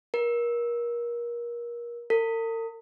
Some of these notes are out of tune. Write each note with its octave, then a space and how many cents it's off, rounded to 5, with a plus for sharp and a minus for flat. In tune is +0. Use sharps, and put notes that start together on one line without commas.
A#4 +30
A#4 -45